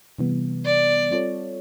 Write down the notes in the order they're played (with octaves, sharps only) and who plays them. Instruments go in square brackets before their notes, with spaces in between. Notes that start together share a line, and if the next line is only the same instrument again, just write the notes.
[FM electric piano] C3 E3 G3 B3
[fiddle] D5
[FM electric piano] G3 C4 F4 A4 C#5